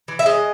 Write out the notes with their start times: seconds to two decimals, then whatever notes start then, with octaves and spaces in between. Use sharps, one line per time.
0.08 E3
0.19 E5
0.26 G#3 D#5